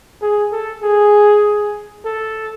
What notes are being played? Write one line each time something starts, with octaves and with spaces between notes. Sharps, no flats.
G#4
A4
G#4
A4